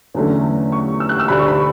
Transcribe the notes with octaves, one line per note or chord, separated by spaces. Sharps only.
E2 D3 F#3 A3 C#4
C#6
E6
F#6
E6
D2 D3 G3 D4 B5
C#6
B5